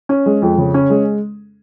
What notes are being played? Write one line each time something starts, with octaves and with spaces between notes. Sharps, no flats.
C#4
G#3
F2
C#3
C#4
G#3